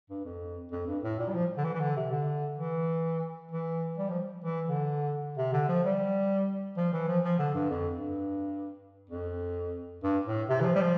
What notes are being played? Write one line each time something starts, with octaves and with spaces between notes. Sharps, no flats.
G2
F2
F2
G2
A2
A#2
G3
F3
D3
E3
E3
D3
C3
D3
E3
E3
G3
F3
E3
D3
C3
D3
F3
G3
F3
E3
F3
F3
D3
G2
F2
G2
F2
G2
A2
C3
E3
F3
G3
F3